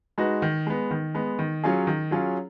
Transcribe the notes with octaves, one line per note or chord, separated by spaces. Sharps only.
G#3 D#4 F#4 B4
D#3
G#3 B3
D#3
G#3 B3
D#3
F#3 C#4 F4 G#4
D#3
F#3 C#4 F4 G#4